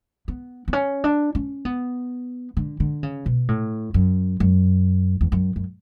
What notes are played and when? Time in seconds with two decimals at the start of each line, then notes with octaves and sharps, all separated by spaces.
0.28 B3
0.68 B3
0.73 C#4
1.04 D4
1.35 C#4
1.65 B3
2.57 D3
2.80 D3
3.03 C#3
3.26 B2
3.48 A2
3.94 F#2
4.40 F#2
5.21 E2
5.32 F#2
5.56 F#2